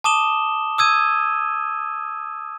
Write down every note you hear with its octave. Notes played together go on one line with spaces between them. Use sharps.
A5 D6 D#6 E7 G7
D#6 E6 G#6 D#7